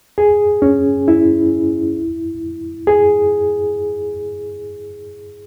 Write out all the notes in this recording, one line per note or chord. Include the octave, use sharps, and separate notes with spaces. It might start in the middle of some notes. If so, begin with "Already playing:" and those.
G#4
C#4
E4
G#4